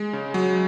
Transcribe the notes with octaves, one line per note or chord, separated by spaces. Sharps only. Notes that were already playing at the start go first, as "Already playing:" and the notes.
Already playing: G#3
C#3
F#3